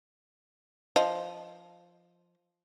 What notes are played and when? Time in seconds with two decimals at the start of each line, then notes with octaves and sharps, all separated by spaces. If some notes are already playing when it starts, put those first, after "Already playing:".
0.96 F3 D#5